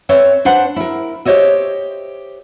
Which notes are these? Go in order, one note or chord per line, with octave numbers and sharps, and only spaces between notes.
C4 B4 C#5 E5
D4 B4 C5 F#5
E4 A#4
G4 C5 C#5 D#5 E5